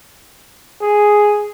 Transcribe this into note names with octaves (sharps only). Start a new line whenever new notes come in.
G#4